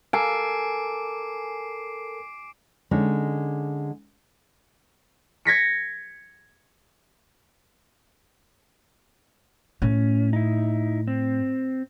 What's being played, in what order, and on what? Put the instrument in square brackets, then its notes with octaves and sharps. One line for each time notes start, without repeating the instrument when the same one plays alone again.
[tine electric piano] A4 A#4 [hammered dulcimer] G#5 [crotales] D6 C7 D7
[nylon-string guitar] D3 G#3 C#4 D#4
[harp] G#6 A#6 B6 C#7
[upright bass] A2 [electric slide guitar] C#4
[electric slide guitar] D#4 E4
C4